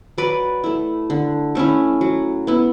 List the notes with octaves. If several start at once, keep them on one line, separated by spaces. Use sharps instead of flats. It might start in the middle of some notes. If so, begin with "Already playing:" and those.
F#3 B4 D5
A3 E4
D3
A3 C#4 E4
F#3
B3 E4